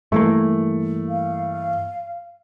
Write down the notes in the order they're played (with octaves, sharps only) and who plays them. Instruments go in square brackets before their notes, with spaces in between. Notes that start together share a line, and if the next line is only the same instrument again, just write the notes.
[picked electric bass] G2 E3 A#3 [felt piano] A3
[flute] F5